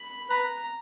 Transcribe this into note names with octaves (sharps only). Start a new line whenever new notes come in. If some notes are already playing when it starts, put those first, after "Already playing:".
Already playing: B5
B4 A#5